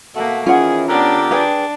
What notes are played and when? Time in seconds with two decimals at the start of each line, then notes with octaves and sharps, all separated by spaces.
0.15 B2 A3 A#3 F#5
0.46 D#3 E3 C#4 F4 G#4 F#5
0.88 D3 B3 D4 G4 A#4
1.31 D4 G#4 B4 G5